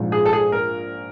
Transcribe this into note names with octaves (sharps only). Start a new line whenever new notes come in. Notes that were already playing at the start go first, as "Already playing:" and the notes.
Already playing: A#1 G#2 F3
G#4
A4
G#4
A#4